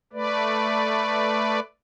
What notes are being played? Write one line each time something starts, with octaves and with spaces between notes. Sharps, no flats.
A3 B4 D5